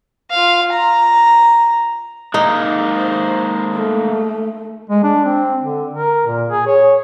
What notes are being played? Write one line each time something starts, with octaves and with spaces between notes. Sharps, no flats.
F4 F5
A#5
G#3 A#3 C4 D#4
C5
A3
G#3
D4
C4
D3
A#4
A#2
G#4
C#5